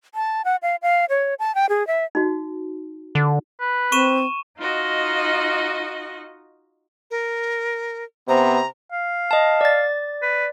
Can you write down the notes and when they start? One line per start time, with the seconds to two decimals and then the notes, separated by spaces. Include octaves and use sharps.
0.15 A5
0.45 F#5
0.62 F5
0.82 F5
1.09 C#5
1.39 A5
1.55 G5
1.69 G#4
1.87 E5
2.15 D#4 F#4
3.15 D3
3.61 B4
3.92 C4 C#6 D#7 E7
4.58 D#4 F4 F#4 D#5
7.11 A#4
8.28 C3 B3 C5 A#5
8.92 F5
9.31 D#5 A5
9.61 D5 A6
10.22 B4